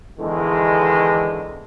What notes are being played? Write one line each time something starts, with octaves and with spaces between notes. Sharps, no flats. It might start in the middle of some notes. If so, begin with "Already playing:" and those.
E2 D3 D#3 G#3